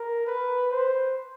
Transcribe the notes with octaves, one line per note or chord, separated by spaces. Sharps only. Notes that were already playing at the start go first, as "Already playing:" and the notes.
Already playing: A#4
B4
C5